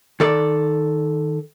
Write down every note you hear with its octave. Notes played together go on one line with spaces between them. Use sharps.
D#3 A4 D5